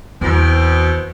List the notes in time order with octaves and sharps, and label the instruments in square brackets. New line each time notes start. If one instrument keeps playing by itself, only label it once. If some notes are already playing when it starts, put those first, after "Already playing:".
[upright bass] E2 [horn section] B2 C4